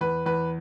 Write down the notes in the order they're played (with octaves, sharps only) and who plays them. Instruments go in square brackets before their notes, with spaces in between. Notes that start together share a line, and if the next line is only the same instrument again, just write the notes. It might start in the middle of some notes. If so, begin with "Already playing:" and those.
[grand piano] E2 B4
E2 B4